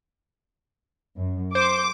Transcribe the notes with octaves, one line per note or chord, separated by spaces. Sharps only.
F#2
C5 D6